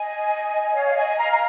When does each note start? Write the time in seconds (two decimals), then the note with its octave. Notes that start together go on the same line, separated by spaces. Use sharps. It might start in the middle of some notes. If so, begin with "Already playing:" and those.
Already playing: D#5 G#5
0.74 C#5 F5
0.87 F5
0.96 D#5 G#5
1.17 F5 A#5
1.33 A#5